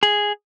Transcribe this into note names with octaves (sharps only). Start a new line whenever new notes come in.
G#4